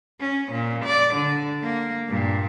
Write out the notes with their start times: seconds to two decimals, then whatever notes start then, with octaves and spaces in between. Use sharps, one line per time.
0.20 C#4
0.52 A#2
0.84 D5
1.14 D3
1.63 A#3
2.09 G2 A#2